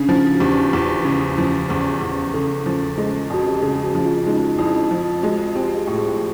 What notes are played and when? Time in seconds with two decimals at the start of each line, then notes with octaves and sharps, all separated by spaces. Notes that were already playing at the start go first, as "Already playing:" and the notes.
Already playing: C#3 C#4 D4
0.08 F3 D#4
0.25 F4
0.35 F#4
0.40 E2 G4
0.73 E2
1.05 C#3
1.38 F3
1.69 E2 G#4
2.01 E2
2.34 C#3 A4
2.66 F3
2.98 G#3
3.30 F2 F#4
3.48 G4
3.62 C#3 G#4
3.83 F#4
3.95 F3
4.05 F4
4.27 G#3 D#4
4.58 F2 E4
4.91 F3 F4
5.23 G#3 F#4
5.55 C4 G4
5.76 G#4
5.87 A2
5.98 G#4